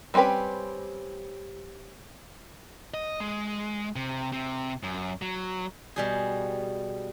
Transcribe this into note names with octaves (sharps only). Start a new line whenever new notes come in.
G3 C4 C#4 G4 B4
D#5
G#3
C3
C3
F#2
F#3
B2 G3 G#4